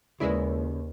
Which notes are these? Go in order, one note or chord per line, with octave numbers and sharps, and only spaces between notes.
D#2 C#3 G#3 E4 A#4 B4 D5